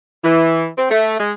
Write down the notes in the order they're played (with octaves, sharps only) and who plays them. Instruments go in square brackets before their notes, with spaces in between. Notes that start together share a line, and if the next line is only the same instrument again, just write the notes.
[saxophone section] E3
C4
A3
G#3